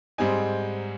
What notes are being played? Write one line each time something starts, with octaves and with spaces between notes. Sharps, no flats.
G#2 G3 C4 D#4 G#5